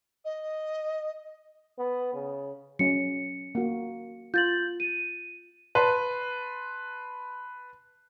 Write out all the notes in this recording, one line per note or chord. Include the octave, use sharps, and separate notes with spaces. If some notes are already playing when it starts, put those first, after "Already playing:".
D#5
B3
C#3
F#3 C#4 C#7
A#3 F#4
F4 G6 A6 F#7
D#7
B4 A5 C6